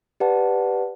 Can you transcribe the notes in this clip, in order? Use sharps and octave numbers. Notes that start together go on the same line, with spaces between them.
G4 B4 D5 F#5 A5